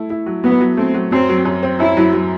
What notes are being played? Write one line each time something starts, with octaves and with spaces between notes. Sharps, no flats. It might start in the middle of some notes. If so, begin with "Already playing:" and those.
Already playing: A3 E4
E4
F#3
F#3 B3
F#3
A3 C4
F#3
F#2 C4
F#3
F#2
C4
F#2 E4
F#3
F#3